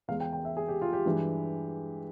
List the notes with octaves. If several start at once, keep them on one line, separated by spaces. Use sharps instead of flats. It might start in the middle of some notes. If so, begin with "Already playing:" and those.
E2 E3 G#3 F5
G5
G5
E5
G#4
G4
F4
G4
G2 E3 G#3